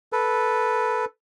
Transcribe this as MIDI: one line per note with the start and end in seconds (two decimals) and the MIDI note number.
0.12 1.05 69
0.12 1.05 71